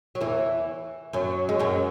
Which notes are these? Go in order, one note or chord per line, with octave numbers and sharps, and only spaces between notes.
F#3
E2 E3
F#2 F#3
G#3
F#2 F#3